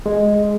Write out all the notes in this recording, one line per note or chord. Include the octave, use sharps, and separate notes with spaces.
G#3